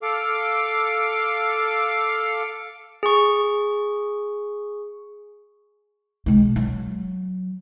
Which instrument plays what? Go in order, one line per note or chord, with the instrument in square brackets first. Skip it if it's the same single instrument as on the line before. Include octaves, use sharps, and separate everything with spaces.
[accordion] A4 F5 D6
[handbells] G#4 C#6
[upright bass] B2 G#3
F#3